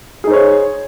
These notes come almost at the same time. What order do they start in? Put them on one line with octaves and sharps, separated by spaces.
G#4 D#4 C5 C#5